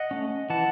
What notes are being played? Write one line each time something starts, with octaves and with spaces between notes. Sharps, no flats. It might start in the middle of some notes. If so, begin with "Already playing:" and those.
Already playing: D#5 F#5
A3 C#4
E3 F#5 A5